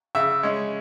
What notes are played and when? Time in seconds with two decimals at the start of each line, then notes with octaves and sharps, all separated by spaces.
0.15 C#3 E5
0.43 G#3 C#4